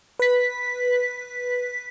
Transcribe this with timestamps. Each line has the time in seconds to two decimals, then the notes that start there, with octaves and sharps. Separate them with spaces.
0.19 B4 B6